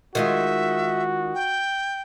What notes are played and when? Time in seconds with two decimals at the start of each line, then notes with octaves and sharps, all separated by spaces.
0.15 D#3 G#3 F4 F#4 E5
1.35 G5